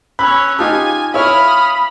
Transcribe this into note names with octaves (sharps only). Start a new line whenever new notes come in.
C#4 C#5 B5 E6 F#6
D#4 F4 G4 G#5 A5 D#6
E4 C#5 F5 B5 D#6 F6